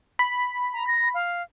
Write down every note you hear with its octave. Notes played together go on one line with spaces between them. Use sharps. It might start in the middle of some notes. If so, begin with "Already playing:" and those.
B5
A#5
A#6
F5